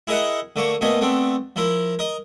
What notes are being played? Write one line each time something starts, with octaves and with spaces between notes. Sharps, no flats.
E4 G#4 A#4 D#5 E5 F#5
D3 A3 A#3 C#6
A#2 A3 B3 D#5 G#5
A3 B3 C4 D4
F3 E4 A#4
A#4 D#5